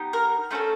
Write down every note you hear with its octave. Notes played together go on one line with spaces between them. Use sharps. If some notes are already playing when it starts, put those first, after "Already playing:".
Already playing: B3 D#4 G4
A#4
A3 C#4 F#4 A4 C5